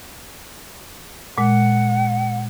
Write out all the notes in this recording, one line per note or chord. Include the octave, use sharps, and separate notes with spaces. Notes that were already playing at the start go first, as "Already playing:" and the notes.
A#2 G#3 F#5